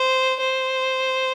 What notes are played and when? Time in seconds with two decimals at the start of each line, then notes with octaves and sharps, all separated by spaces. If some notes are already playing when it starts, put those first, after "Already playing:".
Already playing: C5
0.40 C5